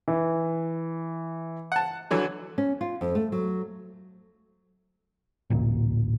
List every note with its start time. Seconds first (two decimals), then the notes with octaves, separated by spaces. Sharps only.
0.08 E3
1.72 F#5 A5
2.11 D3 E3 F#3
2.58 C#4
2.81 F4
3.01 F2
3.15 A3
3.32 F#3
5.50 A1 D2 A#2